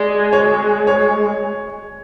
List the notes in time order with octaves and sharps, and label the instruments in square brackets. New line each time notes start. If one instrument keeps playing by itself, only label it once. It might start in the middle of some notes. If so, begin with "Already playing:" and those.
Already playing: [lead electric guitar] G#3 [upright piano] D5
[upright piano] C#5
C#5